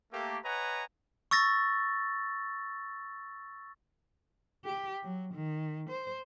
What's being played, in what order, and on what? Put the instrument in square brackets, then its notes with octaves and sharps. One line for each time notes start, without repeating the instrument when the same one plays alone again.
[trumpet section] A3 A#3 G4
B4 C#5 D#5 F#5 G#5 A#5
[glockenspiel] C#6 E6 A6 A#6
[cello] G4
F#3
D#3
C5